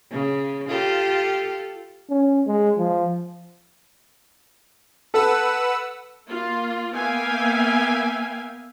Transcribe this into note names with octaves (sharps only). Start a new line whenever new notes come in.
C#3
F4 G4 A4
C#4
G#3
F3
A4 B4 F#5 E6
A#3 F4
A#3 B3 E5 F5 G5 G#5